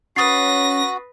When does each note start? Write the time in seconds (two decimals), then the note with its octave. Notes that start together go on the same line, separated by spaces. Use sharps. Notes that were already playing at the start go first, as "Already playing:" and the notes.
0.16 C#4 F#4 B4 D#6 A6 A#6 C7